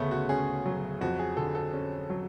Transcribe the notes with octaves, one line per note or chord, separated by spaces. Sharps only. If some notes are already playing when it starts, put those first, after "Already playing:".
Already playing: D2 C#3 A3 B3 C#4
F#4
C#4 G#4
F#3
F2 F#4
G#4
D3 A4
A4
C#4
F#3